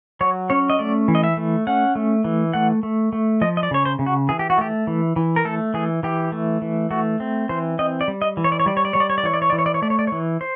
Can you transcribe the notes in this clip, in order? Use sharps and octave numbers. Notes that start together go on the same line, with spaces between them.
F#3 C#5
C#4 C#5
D#5
A3 D5
E3
D#5
E5
A3
C#4 F#5
A3
E3
A3 F#5
A3
A3
F3 D#5
D#5
D5
C#3 C#5
C5
C#3
F#4
E3 G#4
G4
F#4
A3 G4
E3
E3
A#4
A3 A4
E3 G#4
E3 G4
A3
E3
A3 F#4
C4
E3 C5
C4 D#5
D5
G3
D#5
E3
C#5
D5
C#5
G3 D5
C#5
D5
G3 C#5
D5
C#5
D5
E3 C#5
D5
C#5
E3 D5
C#5
D5
C#5
A3 D5
C#5
D5
E3 C#5
C5